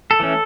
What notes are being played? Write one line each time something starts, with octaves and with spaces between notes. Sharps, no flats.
A4
E3 A3 C#4